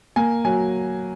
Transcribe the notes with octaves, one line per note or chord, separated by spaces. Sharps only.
A#3 G#5
F#3 G#5